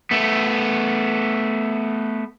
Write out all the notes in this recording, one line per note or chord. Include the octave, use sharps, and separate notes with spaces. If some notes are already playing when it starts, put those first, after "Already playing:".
A3 B3